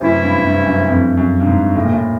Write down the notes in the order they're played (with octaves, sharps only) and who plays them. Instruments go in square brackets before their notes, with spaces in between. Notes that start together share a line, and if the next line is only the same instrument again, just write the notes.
[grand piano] F#2 [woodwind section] C3 E3 A3 C#4 E4
[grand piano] G2
G2
F#2
F2
F#2
G2
G#2
A2
A#2
A2